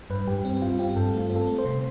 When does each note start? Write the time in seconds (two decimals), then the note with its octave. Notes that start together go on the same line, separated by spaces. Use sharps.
0.10 G2 B4
0.27 G2 G4
0.45 C4
0.62 G2 F4
0.79 C4 G4
0.96 G2 A4
1.13 A3 F4
1.30 C4
1.36 A4
1.47 A3
1.58 C5
1.65 C3